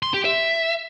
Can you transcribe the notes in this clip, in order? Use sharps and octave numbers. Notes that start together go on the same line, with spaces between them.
C6
G4
E5